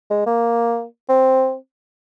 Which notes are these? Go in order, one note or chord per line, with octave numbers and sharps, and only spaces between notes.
G#3
A#3
C4